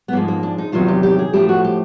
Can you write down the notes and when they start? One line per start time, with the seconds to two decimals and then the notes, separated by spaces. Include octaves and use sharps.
0.08 B3
0.12 G#2 F3 G#3 A#3
0.28 A#3
0.43 D4
0.58 D#4
0.72 E2 C3 D#3 F#3 F4
0.88 G4
1.03 G4
1.19 G#4
1.33 A2 F3 A3 G4
1.49 F#4
1.64 G4